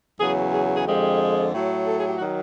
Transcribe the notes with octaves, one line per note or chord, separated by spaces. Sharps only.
E2 C#3 F#3 G#4
G#4
G#4
F2 D3 F3 G#3 G4
A2 F#3
A4
G#4
G4
D#3 F#3 F#4